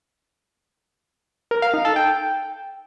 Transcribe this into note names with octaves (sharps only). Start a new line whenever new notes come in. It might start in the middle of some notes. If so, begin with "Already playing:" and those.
A#4
F5
D#4
A4
G5